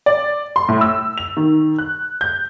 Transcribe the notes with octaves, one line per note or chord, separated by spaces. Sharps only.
D5
C6
A2
E6
F7
D#3
F#6
G6